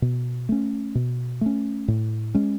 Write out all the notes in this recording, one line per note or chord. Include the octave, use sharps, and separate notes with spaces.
B2
A3 C#4
B2
A3 C#4
A2
G#3 C#4